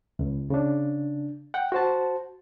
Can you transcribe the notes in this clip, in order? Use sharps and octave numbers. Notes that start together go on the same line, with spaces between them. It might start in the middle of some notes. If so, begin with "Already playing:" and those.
C#2
C#3 D4
F#5 G5
F#4 C5 A5